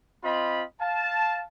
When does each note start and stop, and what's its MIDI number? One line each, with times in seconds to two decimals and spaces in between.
0.24 0.64 60
0.24 0.64 65
0.24 0.64 75
0.24 0.64 83
0.81 1.44 77
0.81 1.44 81